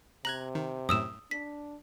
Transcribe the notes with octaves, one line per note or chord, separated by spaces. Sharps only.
C3 A#5 F#6 G#6 F#7
D#3
F#2 A2 D#6 E6 E7
D4 B6